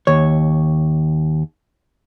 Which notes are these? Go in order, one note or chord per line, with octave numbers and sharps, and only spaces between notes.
D#2 C#5